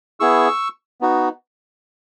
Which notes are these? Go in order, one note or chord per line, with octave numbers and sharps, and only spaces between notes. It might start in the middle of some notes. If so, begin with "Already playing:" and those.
B3 E4 G#4 C#6 E6
B3 D#4 F#4